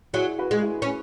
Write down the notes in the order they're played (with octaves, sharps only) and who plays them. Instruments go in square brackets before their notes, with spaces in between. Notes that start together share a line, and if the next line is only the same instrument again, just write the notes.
[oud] F#3 [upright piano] E4 G#4
[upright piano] F#4 B4
[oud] G#3 [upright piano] F#4
[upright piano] E4 G#4
[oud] C#4